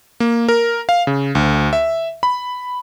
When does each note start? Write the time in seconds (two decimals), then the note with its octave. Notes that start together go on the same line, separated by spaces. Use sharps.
0.20 A#3
0.49 A#4
0.89 F5
1.07 C#3
1.35 D2
1.73 E5
2.23 B5